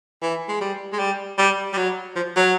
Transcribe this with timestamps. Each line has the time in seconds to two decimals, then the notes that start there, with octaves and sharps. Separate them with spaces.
0.22 E3
0.49 G#3
0.61 G3
0.93 G#3
0.99 G3
1.38 G3
1.73 G3
1.77 F#3
2.16 F3
2.36 F#3